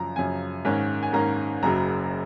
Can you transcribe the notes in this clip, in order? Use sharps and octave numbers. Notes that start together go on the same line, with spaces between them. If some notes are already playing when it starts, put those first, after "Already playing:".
Already playing: F#2 C#3 F3 A#5
F#2 C#3 F3 G#5
G#2 D#3 A#3 C#4
G#5
G#2 D#3 A#3 C#4 A#5
F#1 F#2 C#3 F#3 A#5